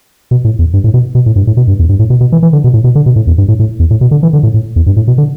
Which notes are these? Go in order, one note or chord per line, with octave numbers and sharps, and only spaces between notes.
B2
A2
E2
G2
A2
B2
B2
A2
G2
A2
B2
G2
E2
G2
A2
B2
B2
E3
E3
D3
B2
A2
B2
D3
B2
A2
E2
G2
A2
A2
E2
A2
B2
D3
E3
D3
A2
A2
E2
G2
A2
B2
D3